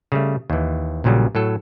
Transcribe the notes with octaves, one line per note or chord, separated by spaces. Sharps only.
C#3 G3 A3
D#2 E3
A#1 A#2 C#3 F#3 G3
A2 F#3 A4